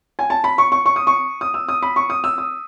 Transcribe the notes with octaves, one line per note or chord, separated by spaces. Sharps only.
G#5
A5
B5
C#6
C#6
C#6
D#6
C#6
D#6
E6
D#6
B5
C#6
D#6
E6
D#6